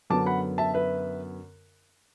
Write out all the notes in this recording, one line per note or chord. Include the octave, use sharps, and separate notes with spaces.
F#2 D3 F#3 B3 A5 D6
F#5 B5
E5 A5
B4 E5